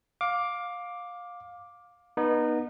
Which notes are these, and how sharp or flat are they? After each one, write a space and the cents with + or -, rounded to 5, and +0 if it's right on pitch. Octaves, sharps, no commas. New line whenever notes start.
F5 +20 D6 +0
B3 -25 D#4 -20